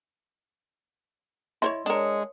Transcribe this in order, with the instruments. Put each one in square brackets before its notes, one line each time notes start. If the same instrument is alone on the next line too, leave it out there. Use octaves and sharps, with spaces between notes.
[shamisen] E4 C5 C#5 [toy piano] D#5 E5 C6
[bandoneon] G#3 [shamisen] D4 A#4 [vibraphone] C#5 D#6